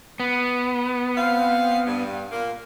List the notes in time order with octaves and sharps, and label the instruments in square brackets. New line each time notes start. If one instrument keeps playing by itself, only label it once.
[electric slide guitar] B3
[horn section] C4 F5
G2
A#2 A#3